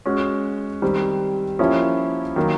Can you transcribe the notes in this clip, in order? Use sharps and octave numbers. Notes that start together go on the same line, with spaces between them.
G#3 C#4 F#4
D#3 G3 C4
F3 A#3 C#4 E4 G4
D#3 F#3 A#3